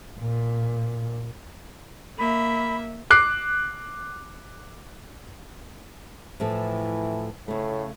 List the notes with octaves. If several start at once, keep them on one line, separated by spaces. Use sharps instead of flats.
A#2
A#3 E5 B5
D6 F#6 C7
A2 E3 F3 A4
A2 C#3 A3